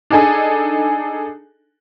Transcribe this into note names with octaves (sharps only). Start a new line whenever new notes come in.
D4 D#4 G#4 A4 G#5